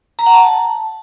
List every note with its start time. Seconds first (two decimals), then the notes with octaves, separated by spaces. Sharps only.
0.19 A#5
0.26 F#5
0.34 A5